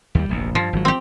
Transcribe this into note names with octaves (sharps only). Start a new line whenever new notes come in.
D#2 G3
F1 A#1 D#2
G2 F3
G#1 F#3
C4 G4